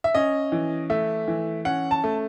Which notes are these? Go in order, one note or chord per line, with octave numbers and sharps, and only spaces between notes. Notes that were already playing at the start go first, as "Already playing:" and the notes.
E5
C#4 D#5
E3
A3 E5
E3
C#4 F#5
A5
A3